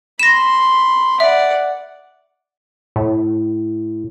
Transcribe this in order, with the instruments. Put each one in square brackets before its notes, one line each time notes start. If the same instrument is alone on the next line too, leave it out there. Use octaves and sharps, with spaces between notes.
[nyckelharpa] B5 C6 [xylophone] A#6 E7
[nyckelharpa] D5 F#5 [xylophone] E5
[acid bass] A2